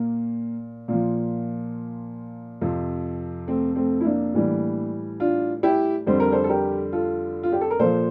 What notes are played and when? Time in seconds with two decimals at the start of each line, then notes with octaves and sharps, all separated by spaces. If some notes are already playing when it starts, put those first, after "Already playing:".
Already playing: A#2 A#3
0.88 A#2 F3 A#3
2.61 F2 C3 F3
3.48 A3 C4
3.76 A3 C4
4.01 E4
4.05 A#3 D4
4.34 A2 E3 G3
5.20 D4 F4
5.63 E4 G4
6.06 F2 D3 G3 C5
6.20 A#4
6.32 A4 C5
6.44 A4
6.49 G4 A#4
6.93 F4 A4
7.43 F4
7.52 G4
7.61 A4
7.71 A#4
7.79 A#2 F3 A4 C5